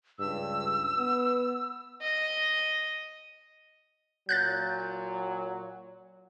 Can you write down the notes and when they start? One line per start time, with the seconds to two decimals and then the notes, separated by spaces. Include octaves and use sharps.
0.19 C#2 G2 E6
0.97 B3
2.01 D#5
4.29 A#2 F#3 F#6 G6 A6